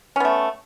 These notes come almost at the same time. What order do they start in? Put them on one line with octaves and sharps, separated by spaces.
C#4 B3 A3